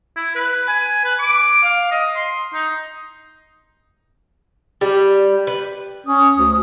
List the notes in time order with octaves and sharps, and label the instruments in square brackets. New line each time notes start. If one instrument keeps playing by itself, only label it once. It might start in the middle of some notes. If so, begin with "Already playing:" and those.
[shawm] E4
B4
G#5
B4
D6
F5
D#5
C6
D#4
[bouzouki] G3
B4
[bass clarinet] C#4 [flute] D#6
[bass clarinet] D2